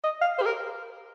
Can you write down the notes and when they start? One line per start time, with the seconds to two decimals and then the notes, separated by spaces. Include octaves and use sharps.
0.04 D#5
0.21 F5
0.38 C5
0.42 G4
0.46 A#4